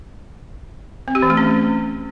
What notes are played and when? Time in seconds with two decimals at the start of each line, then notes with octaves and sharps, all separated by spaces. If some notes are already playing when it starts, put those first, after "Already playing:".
1.08 C4
1.15 G4
1.22 E3
1.30 A3
1.37 C#4